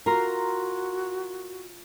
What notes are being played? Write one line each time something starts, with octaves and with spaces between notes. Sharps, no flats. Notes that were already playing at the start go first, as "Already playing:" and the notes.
F4 F#4 A#4 A#5 C6